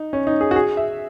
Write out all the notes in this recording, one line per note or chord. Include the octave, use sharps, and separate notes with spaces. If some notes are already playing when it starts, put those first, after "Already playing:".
Already playing: D#4
C#4
D#4
G#4
F#4
G#4
E5